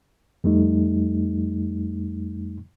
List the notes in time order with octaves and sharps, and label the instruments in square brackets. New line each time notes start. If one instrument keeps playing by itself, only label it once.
[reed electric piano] F2 G3 A3 D#4